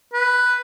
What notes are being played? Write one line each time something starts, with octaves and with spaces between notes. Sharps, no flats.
B4